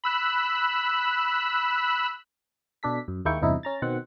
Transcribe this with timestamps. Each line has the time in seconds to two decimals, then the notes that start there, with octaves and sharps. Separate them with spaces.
0.04 B5 E6 F#6
2.83 B2 D4 A4 B6
3.08 F#2
3.25 D#2 G#3 A#3 E4 G5 C#6
3.42 E2 G2 C3 D#4 E4
3.63 C#4 A#5 A6
3.82 B2 D#3 C4 F#5